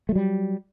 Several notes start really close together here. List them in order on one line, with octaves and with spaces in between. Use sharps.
A3 F#3 G3